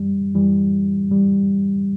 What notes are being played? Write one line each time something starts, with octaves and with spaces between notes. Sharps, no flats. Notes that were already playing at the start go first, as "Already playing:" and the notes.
Already playing: F#2 E3 G3
F#2 E3 G3
E3 G3